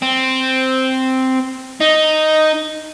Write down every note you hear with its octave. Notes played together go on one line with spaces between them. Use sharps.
C4
D#4